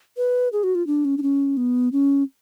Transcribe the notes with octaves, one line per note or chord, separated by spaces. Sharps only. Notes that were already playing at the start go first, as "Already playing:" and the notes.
B4
G#4
F#4
F4
D4
C#4
D4
C#4
B3
C#4